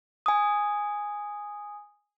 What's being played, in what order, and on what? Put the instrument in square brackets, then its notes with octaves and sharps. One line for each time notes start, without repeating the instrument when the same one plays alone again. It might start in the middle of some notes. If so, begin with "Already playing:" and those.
[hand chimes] G#5 D#6